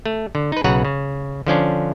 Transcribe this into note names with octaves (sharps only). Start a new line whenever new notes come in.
A3
D3
D#4 B4
B1 C#3 F#4 B4 F#5 A#5
C#3
D3 F3 C#4 D4